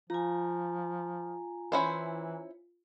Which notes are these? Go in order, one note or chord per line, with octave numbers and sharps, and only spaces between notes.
F3 F4 G#5 A#5
E3 C#4 E4 C5